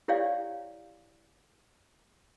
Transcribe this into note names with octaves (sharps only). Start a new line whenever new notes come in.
E4 G4 C#5 D5 F5 G5